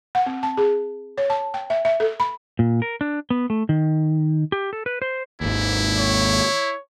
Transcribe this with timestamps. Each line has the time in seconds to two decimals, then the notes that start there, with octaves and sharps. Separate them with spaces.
0.15 F#5
0.26 C4
0.43 A5
0.57 G#4
1.18 C#5
1.30 A5
1.54 G5
1.70 E5
1.85 E5
2.00 A4
2.20 B5
2.59 A#2
2.82 A#4
3.01 D4
3.30 B3
3.50 A3
3.69 D#3
4.52 G4
4.73 A4
4.86 B4
5.02 C5
5.41 G#1 D#2 E4
5.98 C#5